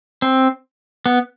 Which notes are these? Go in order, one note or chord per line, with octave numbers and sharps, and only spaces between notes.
C4
B3